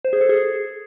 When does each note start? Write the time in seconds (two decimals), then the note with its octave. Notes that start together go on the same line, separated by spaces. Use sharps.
0.05 C5
0.13 G#4
0.21 A4
0.29 G#4